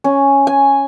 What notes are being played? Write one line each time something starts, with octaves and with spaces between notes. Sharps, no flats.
C#4
G#5